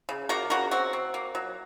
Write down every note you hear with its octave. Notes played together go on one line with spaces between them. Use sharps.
C#3
A#3 F#4 A#4
C#3 F#4 A#4
C4 F#4
C4
A#3
F#3